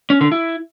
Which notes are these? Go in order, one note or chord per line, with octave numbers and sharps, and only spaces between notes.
C#4
D3
E4